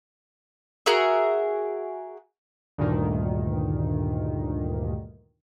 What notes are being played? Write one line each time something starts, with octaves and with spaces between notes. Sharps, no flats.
F#4 G#4 A#4 E5
D2 G2 A#2 D#3